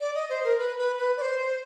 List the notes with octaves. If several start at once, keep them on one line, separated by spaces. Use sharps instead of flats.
D5
D#5
C5
A#4
B4
B4
B4
D5
C5